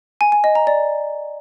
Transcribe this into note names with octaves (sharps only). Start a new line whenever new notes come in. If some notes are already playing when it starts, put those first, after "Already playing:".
G#5
G#5
D#5
A#5
D5